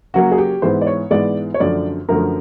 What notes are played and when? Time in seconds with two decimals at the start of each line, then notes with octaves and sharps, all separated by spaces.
0.14 C#3 F#3 A#3 F#4
0.32 G#4
0.38 G4
0.62 G#2 E3 G#3 B3 C5
0.81 D5
0.87 C#5
1.11 G#2 E3 G#3 B3 D5
1.54 C#5
1.60 F#2 D3 F3 A3 D5
2.09 F#2 D3 F3 A3 A#4